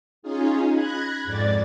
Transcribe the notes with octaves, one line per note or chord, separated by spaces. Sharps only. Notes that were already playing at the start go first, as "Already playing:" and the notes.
C#4 D#4 F4 G#4
B5 F#6 G#6 A#6
F2 G#2 D5 A6